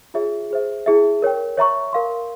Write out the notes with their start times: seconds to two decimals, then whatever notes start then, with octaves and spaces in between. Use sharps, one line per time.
0.14 F4 G#4 C#5 E5
0.51 G#4 C5 E5
0.86 E4 G#4 E5
1.22 A#4 C#5 G5
1.57 C#5 E5 A#5 C#6
1.93 A#4 F5 C6